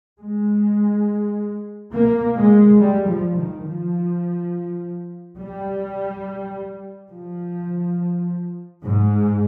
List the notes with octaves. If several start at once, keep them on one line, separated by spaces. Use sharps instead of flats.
G#3
A#3
G#3
G3
F3
D#3
F3
G3
F3
G#2